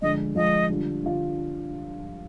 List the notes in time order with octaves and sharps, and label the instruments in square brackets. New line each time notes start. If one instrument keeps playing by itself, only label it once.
[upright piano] D3 F3 G#3 D4 [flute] D#5
[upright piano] D3 F3 G#3 D4 [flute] D#5
[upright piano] D3 G3 D4 F4
D3 G3 D4 F4